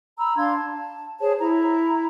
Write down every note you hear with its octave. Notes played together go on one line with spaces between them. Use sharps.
A#5 B5 E6
D4 F5 C6 G#6
A5
G#4 C5 C#5 A5
E4 A#5